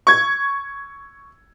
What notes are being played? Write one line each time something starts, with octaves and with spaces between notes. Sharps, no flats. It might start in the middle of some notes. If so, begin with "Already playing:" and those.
C#6 G#6